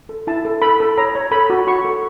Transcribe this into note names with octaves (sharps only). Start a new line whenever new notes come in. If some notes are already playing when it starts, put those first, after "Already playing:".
A4
E4 A5
A4
A4 B5
A4
C#5 A#5
C#5
A4 B5
F#4
F#4 C#6
A4